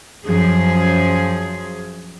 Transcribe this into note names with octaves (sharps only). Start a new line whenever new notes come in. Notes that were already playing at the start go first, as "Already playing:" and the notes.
F#2 F3 G#4